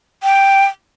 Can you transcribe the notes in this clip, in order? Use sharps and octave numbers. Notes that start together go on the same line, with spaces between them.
G5